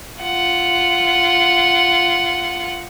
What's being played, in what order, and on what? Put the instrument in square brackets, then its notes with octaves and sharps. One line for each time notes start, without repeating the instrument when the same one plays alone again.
[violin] F4 F#5